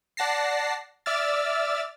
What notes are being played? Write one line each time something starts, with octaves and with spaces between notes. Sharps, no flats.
D5 F#5 A5 A#6 C7
D5 E5 D6 E6 F6 A6